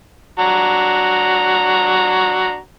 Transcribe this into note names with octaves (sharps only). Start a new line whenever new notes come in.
D4 F#4 A#5